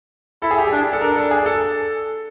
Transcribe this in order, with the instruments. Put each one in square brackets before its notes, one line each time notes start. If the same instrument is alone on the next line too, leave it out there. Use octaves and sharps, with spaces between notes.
[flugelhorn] E4 [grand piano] A4
[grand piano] G#4
G4
[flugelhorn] D4 [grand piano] G#4
[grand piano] A4
[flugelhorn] D4 [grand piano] A#4
[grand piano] A4
G#4
A4